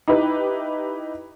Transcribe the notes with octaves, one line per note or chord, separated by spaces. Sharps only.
D#4 E4 G4 B4